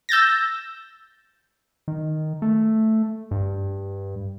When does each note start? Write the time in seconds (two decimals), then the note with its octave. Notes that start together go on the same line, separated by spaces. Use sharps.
0.09 E6 G6 A6 A#6
1.88 D#3
2.42 A3
3.31 G2